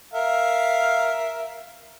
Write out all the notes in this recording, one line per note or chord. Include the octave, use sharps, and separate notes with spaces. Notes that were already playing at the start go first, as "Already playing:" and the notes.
A#4 E5 F5